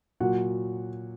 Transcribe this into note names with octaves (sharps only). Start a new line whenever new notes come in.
A#2 F#3 F#4 F#5